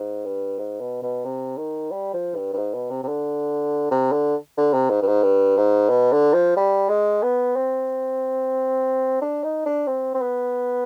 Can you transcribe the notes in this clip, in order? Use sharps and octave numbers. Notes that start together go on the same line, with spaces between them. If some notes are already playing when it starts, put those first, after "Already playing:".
Already playing: G#2
G2
G#2
B2
B2
C3
D#3
G3
F3
G2
G2
G#2
B2
C3
C3
D3
C3
D3
D3
C3
G#2
G2
G#2
G2
G#2
B2
D3
F3
G3
G#3
B3
C4
D4
D#4
D4
C4
C4
B3